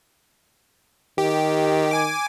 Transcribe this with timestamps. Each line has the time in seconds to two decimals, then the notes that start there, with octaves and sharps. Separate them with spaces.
1.18 D#3 G4
1.91 G#5 D6